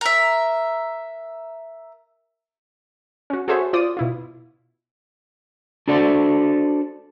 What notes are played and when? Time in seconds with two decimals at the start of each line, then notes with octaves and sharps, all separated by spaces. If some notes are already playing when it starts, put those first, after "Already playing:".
0.01 A#4 E5
3.30 C#4 F#4
3.48 F#4 G#4 A4 C5 C#5 E5
3.73 F4 C5 D5 D#6
3.97 B2 E4 F4
5.88 D4 F#4 A4 C5 D5